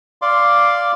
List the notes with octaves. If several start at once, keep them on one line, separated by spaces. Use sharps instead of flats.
D5 F5 C6 D6